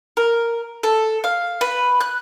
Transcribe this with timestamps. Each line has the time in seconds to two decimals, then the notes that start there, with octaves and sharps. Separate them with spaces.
0.17 A#4
0.83 A4
1.24 F5
1.61 B4
2.01 F#6